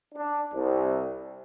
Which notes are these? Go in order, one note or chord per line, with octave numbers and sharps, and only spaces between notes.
D4
C2